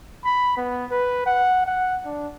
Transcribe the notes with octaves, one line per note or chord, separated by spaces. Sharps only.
B5
B3
B4
F#5
F#5
D4